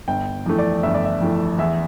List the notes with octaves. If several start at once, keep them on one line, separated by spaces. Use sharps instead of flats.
G1 G5
F2 E3 A3
D5
G1 E5
D5
E5
F2 E3 A3
E2 E5